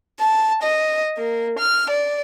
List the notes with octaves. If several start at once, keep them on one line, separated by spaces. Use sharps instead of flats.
A5
D#5
A#3
F6
D5